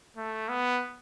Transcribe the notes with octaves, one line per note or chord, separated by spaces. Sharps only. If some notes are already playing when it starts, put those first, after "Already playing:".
A3
B3